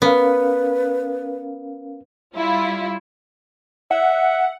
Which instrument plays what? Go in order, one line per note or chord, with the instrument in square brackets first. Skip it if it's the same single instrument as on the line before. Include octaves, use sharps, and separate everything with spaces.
[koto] B3 [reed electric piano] C#4 A#4 F5 [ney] B4
[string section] G3 E4 F4
[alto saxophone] E5 [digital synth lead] F#5